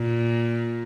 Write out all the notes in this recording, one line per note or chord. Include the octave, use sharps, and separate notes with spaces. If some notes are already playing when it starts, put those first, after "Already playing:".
Already playing: A#2